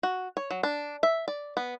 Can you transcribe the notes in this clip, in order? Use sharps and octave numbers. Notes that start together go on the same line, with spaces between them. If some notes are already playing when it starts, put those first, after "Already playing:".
F#4
C#5
F#3
D4
E5
D5
B3